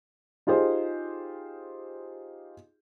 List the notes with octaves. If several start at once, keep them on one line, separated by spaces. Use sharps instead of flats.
D#4 F4 G4 G#4 C5